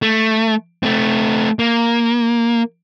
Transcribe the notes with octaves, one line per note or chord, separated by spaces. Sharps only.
A3
A3 C4
A#3